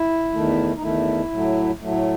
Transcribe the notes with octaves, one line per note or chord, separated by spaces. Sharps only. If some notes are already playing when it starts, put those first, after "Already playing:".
Already playing: E4
E2 D#3 A3
D#4
E2 D#3 A3 E4
A2 F#3 A3
A2 F#3 A3